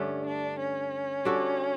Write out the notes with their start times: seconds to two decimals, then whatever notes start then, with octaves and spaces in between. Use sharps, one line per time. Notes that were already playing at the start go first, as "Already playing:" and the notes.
Already playing: G2 D3 A3 C#4
0.24 D4
0.58 C#4
1.25 G3 D4 F#4 A4